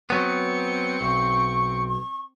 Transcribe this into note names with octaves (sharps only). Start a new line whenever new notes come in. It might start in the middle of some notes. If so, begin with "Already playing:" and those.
F#3 B3 C4 C#7
B1 C#6
C#6